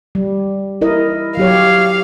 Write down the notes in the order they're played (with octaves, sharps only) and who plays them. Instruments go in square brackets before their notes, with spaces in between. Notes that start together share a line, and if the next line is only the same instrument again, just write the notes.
[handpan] G3
E4 A#4 D#5
[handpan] F#3 G4 C#5 [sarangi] F5